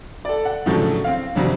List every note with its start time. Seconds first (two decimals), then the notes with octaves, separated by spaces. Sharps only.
0.25 A4 D5
0.45 F#5
0.66 A2 C#3 F3 F#3 D4 A4
1.04 C4 F5
1.35 F2 C3 F#3 D4